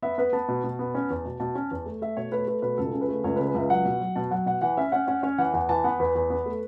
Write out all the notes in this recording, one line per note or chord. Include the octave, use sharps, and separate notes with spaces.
B3 E5
B3 B4
B3 A5
B2
B2
B3
C#4
E2
B2
B2 A5
C#4
E2
A3
A3 E5
B2 C#5
A3 B4
A3 B4
B2 B4
C#2 A4
C#3
B4
A3
C#2 C#5
B4
C#3
B4
C#2 E5
F#3 F#5
B2
F#3
B2 A5
F#3 F#5
B2 F#5
E3 F#5
C#4 E5
C#4 F#5
C#4 F#5
C#4 C#5
E3 F#5
E2 F#5
E3 A5
B3 F#5
E2 B4
E2
B3
A3